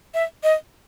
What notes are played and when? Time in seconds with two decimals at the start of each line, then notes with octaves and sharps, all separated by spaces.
0.14 E5
0.43 D#5